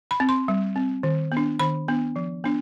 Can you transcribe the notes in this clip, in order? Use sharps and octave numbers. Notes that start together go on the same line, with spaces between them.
B5
C4
C6
G3
C4
D#3
B3
D4
D#3 B5
B3 D4
F3
B3 D4